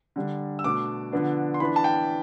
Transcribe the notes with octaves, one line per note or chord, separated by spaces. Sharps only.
D3 G3 D4
E6
B2 A3 D4 D6
D3 F3 B3 D4
C6
E3 B3 D4 B5
A5
G5